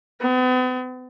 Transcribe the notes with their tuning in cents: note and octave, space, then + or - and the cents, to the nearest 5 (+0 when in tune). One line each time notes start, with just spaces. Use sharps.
B3 +45